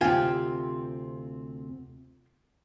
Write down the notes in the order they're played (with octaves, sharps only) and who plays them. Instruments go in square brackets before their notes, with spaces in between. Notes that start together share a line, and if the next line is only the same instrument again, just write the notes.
[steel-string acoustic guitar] D2 C3 C4 [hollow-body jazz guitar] F4 G4 G#5